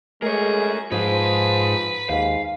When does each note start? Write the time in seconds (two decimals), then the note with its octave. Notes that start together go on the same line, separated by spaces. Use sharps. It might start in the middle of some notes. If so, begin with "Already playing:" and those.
0.22 G#3 A3 G#4 A#4 C#5
0.92 G#2 F3 D#4 G#4 B4
2.09 D#2 G#2 F5